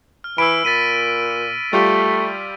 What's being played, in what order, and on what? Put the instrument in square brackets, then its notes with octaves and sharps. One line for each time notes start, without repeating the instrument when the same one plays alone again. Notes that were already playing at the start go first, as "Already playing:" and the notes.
[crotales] F6
[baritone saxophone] E3 [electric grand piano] B5 [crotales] E6 D7
[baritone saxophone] A#2 [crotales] A6 B6 D#7
[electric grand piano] G3 F4 G4 [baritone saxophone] A3